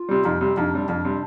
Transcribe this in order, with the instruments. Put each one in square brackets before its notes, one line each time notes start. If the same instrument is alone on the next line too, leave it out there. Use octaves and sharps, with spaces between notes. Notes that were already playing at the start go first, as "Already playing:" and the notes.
Already playing: [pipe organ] F4
[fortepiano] C3 G3
[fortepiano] F2 [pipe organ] D#4
[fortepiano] C3 G3
[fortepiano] F2 [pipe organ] D4
[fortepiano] C3 G3
[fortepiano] F2 [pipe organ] D4
[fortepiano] C3 G3